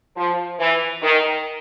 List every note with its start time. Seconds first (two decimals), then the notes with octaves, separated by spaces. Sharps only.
0.16 F3
0.59 E3
1.02 D#3